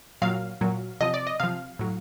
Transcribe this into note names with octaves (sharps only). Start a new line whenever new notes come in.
A#2 F#3 F5
A#2 F#3
C3 F3 D#5
D5
D#5
C3 F3 F5
A2 F#3